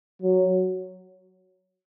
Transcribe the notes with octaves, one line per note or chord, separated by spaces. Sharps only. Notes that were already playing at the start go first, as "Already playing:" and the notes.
F#3